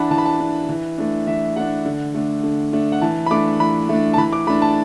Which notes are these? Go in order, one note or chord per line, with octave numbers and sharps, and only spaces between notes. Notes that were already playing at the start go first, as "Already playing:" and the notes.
Already playing: E3 D4 F#5 A5 B5
E3 A5
B5
A5
D4
E3
A3 D4
E3 E5
A3 D4 F#5
D3
A3 D4
D3
A3 D4
F#5
E3 A5
B5
A3 D4 D6
E3 B5
A3 D4
A5
E3 B5
D6
A3 D4 B5
A5